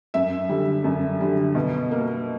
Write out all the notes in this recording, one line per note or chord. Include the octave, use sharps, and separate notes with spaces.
F#2 E5
D3 G3
F#2
D3 G3
B2
A#3